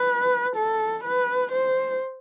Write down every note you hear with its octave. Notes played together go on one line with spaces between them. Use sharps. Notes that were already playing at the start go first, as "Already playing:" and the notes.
Already playing: B4
A4
B4
C5